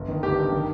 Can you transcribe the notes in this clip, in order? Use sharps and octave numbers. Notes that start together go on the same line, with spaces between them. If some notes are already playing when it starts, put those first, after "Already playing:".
Already playing: G1
D#3
G1 G4
G2
D#3